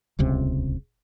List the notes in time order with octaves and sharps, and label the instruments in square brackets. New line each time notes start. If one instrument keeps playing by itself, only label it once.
[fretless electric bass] D#1 C#2 C3